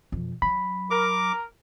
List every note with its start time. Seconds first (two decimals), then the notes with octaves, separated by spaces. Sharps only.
0.12 F2 B2
0.42 F#3 B5
0.91 A#4 D6